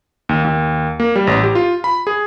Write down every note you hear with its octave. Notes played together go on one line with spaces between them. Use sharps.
D#2
D#2
A#3
G3
A1
G4
F4
B5
G#4